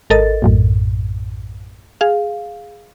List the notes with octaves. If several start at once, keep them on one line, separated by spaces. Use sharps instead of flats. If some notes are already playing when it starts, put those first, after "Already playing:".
G#1 A4 A#4 D#5 A6
A#1 F#2 A2
G#4 F5